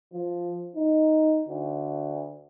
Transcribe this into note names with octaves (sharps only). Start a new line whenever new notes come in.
F3
D#4
D2